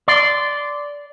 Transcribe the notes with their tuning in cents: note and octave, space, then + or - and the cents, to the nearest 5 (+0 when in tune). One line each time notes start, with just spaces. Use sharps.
D5 -10 C6 -15